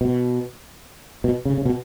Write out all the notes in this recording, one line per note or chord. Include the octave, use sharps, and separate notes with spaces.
B2
B2
C#3
C#3
B2